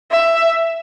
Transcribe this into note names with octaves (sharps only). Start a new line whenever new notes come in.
E5